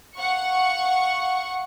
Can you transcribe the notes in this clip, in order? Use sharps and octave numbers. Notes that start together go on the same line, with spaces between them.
F5 F#5 C#6 C#7